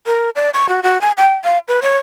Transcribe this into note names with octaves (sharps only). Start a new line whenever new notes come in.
A#4
D5
C#6
F#4
F#4
G#5
G5
F5
B4
C#5